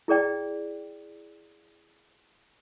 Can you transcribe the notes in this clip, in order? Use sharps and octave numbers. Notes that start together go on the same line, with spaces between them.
E4 G#4 D5 G5